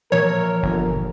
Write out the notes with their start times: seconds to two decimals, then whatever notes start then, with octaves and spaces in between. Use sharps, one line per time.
0.12 A#2 E3 F3 A#4 C#5
0.63 G1